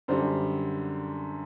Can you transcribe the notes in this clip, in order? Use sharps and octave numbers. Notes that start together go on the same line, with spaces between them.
F#2 D3 G3 C5